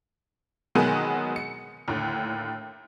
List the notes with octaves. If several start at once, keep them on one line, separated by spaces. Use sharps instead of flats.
B2 D#3 F#3 G#3 B3 G#4
C#7
D#2 A2 D3